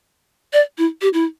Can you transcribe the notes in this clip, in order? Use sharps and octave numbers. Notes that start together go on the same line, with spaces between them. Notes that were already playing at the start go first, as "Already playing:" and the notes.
D5
E4
G4
E4